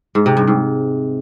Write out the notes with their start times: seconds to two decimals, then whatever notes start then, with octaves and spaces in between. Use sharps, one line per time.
0.15 G#2
0.26 C3
0.37 G2
0.48 G#2